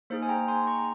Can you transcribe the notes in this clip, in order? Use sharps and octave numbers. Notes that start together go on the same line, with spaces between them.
A#3 D#4 G#4 C5
G#5
G5 A#5
G#5 C6
A#5 C#6